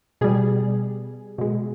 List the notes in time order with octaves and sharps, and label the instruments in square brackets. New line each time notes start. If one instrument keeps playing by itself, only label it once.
[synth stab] B2 G3 G#4
B2 G#3